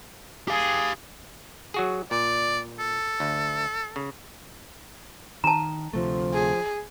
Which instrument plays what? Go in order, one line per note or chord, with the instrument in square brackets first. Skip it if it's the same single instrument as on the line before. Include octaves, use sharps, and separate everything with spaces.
[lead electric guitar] G4 F5 [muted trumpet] G#4
[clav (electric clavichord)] F#3 F#4 G#4
[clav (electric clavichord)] A#2 [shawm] D5
[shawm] A4
[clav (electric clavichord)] D2
C#3
[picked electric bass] D#3 [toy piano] A5 A#5
[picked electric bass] D2 C3 A3 [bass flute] F3
[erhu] G#4